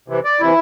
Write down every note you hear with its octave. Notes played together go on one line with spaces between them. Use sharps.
C3 E3
D5
C3 E3 E4